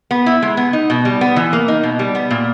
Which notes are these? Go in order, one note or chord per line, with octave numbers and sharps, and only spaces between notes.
B3
E4
G#3
B3
D#4
B2
G3
B3
E3
A#3
D#4
B2
G3
B3
A#2